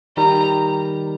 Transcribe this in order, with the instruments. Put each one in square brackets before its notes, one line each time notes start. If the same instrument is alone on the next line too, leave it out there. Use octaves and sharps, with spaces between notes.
[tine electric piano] D#3 G3 [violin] A#5